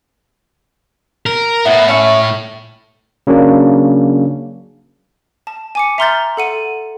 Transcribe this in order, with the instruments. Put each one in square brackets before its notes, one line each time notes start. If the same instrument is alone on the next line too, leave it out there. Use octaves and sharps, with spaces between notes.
[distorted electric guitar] A#4
[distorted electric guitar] A2 [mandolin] B3 E4
[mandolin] C#4 E4 C#6
[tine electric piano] C#3 F#3 A#3 D4
[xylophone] A5
G#5 D6 C#7
E5 A#5 C6 F6 G6 A6
A4 F#5 D#7